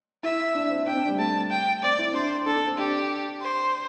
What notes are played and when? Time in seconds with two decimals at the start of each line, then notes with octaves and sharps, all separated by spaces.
0.23 E4 E5
0.55 D4
0.70 C4
0.87 D4 G5
0.93 C4
0.97 D4
1.08 G3
1.18 A3 A5
1.50 G5
1.83 C4 D5
1.98 E4
2.14 D4 C5
2.46 D4 A4
2.56 D4
2.66 C4
2.77 D4 G4
3.41 C5